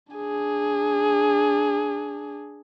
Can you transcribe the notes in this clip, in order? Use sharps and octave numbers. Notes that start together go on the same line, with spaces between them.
D4 G#4